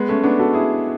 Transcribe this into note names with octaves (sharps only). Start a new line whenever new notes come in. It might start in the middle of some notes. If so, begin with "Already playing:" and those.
Already playing: G#3 B3
A3 C#4
B3 D4
F#4 A4
E4 G#4